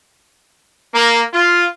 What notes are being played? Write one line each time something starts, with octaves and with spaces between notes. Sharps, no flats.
A#3
F4